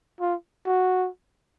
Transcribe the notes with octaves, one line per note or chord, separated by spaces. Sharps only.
F4
F#4